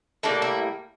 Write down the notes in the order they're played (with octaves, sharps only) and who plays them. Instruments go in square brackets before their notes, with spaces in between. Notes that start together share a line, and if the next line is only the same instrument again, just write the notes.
[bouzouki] A2 G3 A#3 D4
E4